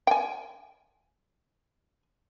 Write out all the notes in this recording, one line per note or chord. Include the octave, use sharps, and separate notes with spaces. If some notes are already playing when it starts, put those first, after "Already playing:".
G5 G#5